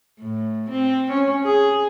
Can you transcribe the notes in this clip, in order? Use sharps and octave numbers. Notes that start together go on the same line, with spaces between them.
A2
C4
C#4
G#4